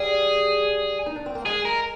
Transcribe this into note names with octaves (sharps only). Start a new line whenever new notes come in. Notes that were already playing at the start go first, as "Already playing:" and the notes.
Already playing: G3 G#4
D#4
D4
C4
A#3
G#3 G#4
A#4